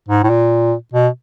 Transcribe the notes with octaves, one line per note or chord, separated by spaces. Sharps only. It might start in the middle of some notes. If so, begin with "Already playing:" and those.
G#2
A2
A#2
B2